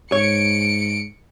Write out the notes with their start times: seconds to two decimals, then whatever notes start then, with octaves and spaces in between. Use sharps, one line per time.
0.12 G#2 C#5 C#7 D7